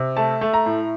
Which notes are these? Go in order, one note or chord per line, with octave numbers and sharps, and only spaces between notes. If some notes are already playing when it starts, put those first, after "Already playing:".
Already playing: C3
A3 A5
A3
A#5
A2